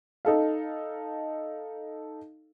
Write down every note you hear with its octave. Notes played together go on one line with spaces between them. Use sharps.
D#4 A4 F5